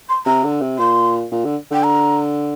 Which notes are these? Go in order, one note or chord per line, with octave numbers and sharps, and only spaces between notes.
C6
C3 A#5
D3
C3
A#2 C6
A#2
D3
D3 G5
A#5